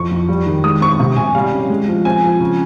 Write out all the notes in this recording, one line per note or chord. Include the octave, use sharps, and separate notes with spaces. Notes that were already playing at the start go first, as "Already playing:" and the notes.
Already playing: F2 C#6
F2
G3
D#3
G#3 D#6
C4 C#6
C3
C3 G#5
G3 F5
C#4
G#3
F3
C4 G#5
F3
C#3